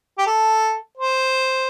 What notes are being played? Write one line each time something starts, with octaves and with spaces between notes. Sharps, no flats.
G4
A4
C5